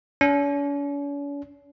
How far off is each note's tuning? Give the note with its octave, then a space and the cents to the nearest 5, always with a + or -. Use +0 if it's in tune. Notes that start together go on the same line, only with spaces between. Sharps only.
C#4 +45